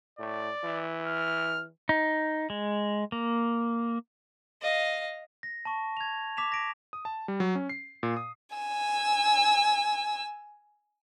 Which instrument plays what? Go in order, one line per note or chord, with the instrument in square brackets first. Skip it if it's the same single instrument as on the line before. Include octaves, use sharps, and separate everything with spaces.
[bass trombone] A2 [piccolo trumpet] D5
[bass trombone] E3
[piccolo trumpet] F6
[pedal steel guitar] D#4
G#3
A#3
[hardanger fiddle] D#5 F5
[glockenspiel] A#6
A5 C#6
G#6 F7
D6 B6 E7 F7
A#6 B6 D7
[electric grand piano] D#6
A5
G3
F#3
C#4
C7
A#2
D#6
[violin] G#5 E6